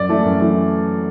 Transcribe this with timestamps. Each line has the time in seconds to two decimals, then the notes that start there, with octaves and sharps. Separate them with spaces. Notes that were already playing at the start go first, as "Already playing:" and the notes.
Already playing: F#2 D5
0.09 E3 A3
0.24 F#2
0.40 E3 A3